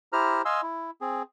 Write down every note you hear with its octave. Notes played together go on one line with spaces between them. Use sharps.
E4 G4 C5 A#5 F6
D#5 F5 G#5 C6 E6
E4
C4 G#4